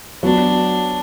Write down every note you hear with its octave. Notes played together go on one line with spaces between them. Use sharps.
F#3 B3 D4 F#4